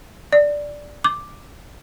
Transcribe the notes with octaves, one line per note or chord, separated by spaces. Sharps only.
D5
D6